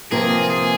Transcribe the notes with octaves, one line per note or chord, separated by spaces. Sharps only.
C3 F3 A#3 F4 G#4
G#4